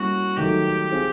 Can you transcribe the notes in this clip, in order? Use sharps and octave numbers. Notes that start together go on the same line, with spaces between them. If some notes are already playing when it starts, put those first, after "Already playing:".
Already playing: G3 A#3 C#4 E4 F#4
D#3 F#3 A3 G4
C4 F4 G#4